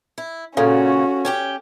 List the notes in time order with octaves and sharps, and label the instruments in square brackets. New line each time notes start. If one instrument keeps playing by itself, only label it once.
[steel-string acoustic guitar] E4
[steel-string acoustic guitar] A#2 C#3 [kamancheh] C#4 F#4 [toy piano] A4 F5
[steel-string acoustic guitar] C#4 G4 G5